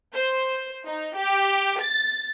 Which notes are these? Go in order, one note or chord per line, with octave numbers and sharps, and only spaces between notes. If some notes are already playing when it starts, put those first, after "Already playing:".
C5
D#4
G4
A6